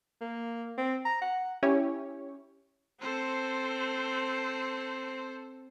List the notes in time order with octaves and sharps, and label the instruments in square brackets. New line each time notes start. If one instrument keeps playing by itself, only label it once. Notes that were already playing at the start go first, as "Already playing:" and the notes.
[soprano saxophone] A#3
C4
A#5
F#5
[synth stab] C#4 E4 G4 C#5
[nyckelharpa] C4 [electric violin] A4 C5